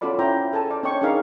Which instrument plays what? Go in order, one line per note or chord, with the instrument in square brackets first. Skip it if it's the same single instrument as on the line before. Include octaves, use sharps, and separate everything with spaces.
[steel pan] C#4 F4 F#4 A4 D5 B5
C#4 E4 C5 G5 A#5
G#4 A4 G#5 A5
C5 D5
C#4 D4 C#5 D#5 G5 C#6
D4 D#4 G#4 A#4 F5